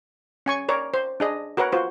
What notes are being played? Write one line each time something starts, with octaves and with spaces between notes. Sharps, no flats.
C#4 G#5 C#6
A#4 C#5 D5
C5
D4 G#4 D#5
F#4 A#4 B4 C#5 F#5
F4 F#4 C5